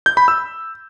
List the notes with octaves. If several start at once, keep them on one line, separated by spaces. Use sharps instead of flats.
G6
B5
E6